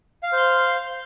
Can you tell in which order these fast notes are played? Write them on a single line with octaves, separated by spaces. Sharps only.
F5 F6 C5 C6